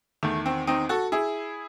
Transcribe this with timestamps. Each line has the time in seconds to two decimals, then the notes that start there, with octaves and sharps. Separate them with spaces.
0.23 E2 D#3 A3
0.46 C4
0.67 C4 D#4
0.89 F#4 A4
1.12 E4 G#4